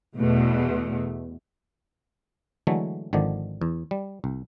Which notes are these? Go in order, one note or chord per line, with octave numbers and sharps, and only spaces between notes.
E2 B2 A3
D3 E3 F#3 G#3 A3
G#1 D3 D#3 F3 D5
E2
G3
C2